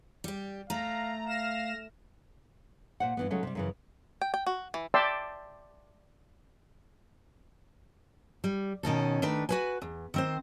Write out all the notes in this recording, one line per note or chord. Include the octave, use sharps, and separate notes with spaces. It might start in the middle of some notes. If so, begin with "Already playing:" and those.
G3 G4
A3 F5 A#5
F5 F6 A#6 E7
A#2 C5 F#5
G2 E3 B3
C#3 F#3 G#3 A3 C#4
C3 G3
F#2 C#3 E3
G5
G5
F#4
E3
D5 E5 G5 A5 C6 E6
G3
B2 D#3 C#4 A4
D#3 A3 D4 B4
F#4 B4 G#5
E2
D#3 C4 C5